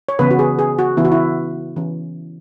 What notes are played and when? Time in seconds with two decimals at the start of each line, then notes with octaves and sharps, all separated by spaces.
0.09 C#5
0.19 C#3 E3 B3 B4
0.31 F#4
0.39 G#4
0.59 G#4
0.79 F#4
0.97 C#3 E3 B3 E4
1.05 F#4
1.12 E4
1.76 E3 C#4